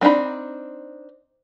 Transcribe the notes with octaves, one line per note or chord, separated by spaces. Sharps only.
F#3 C4 D4 D#4 B5